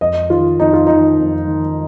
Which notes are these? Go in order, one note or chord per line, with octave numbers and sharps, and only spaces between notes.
F2 D#5
D#3 F4
F2 D#4
F4
D#3 D#4
F2
D#3